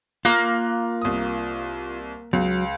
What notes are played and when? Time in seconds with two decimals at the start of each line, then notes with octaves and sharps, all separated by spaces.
0.25 A#3 F4 F#6
1.02 C2 D#6
2.33 C#2 F#3